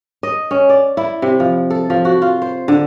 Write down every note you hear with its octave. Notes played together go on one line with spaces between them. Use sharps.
D#5
C#4
D5
E4
C3
F3
A4
F3
F#4
F4
C5
D3